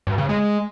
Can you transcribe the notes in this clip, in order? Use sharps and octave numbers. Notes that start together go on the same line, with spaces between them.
G2
C#3
G#3